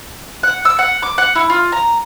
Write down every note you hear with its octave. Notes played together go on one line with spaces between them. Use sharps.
F#5
E6
F#5
D6
F#5
E4
F4
A#5